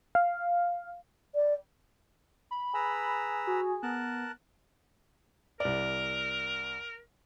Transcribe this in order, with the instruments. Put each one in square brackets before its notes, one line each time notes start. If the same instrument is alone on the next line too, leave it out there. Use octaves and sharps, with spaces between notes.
[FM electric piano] F5
[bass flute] D5
[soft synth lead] B5
[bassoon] G#4 [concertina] B4 A#5 E6
[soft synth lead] F#4
[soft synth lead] B3 [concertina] A#4 A5 F#6
[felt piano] C2 D5 [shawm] A#4